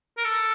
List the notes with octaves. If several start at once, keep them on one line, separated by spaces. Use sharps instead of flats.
A#4
A4